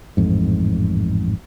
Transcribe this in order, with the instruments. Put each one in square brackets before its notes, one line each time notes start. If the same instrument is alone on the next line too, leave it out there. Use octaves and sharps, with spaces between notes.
[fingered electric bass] A1 F2 G#2